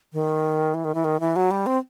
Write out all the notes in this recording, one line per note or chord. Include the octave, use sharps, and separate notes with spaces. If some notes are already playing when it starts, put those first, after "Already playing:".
D#3
E3
D#3
E3
D#3
E3
F#3
G3
C4